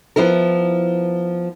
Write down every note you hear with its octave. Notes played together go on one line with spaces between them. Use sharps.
F3 B3 E4 A#4